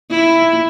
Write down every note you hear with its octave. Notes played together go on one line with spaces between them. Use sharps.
E4